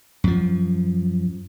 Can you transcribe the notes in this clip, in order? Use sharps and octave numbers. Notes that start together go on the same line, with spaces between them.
F#2 F3